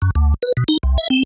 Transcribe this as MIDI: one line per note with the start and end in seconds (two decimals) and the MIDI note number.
0.02 0.11 42
0.15 0.34 38
0.43 0.53 71
0.57 0.64 47
0.68 0.78 63
0.83 0.97 36
0.98 1.08 76
1.10 1.23 60